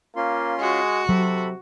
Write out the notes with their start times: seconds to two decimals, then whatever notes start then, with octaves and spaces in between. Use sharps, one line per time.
0.16 A#3 C#4 F4 C6
0.60 G#3 F#4
1.09 C3 F#3 A4 B5